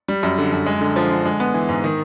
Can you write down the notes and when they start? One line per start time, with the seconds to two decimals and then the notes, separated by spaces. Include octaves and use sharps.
0.08 G3
0.23 F#2
0.38 D3
0.52 F#2
0.66 G#3
0.81 D3
0.96 F3
1.11 D3
1.25 G#3
1.40 B3
1.54 E3
1.69 G#2
1.84 D#3